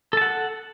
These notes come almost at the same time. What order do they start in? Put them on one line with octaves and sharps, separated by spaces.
A4 A5 F#5